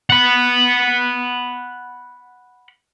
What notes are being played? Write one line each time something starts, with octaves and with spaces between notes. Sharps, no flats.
F#5 B5